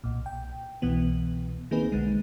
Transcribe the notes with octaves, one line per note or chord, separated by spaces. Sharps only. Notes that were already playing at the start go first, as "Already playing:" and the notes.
B1 A#2
G5
C2 B2 E3 B3
D#3 A#3 C4 D#4 G#4 B4
B1 D3 G#3